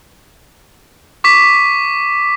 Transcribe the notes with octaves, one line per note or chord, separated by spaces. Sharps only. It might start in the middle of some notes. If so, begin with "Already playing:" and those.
C#6 D6 B6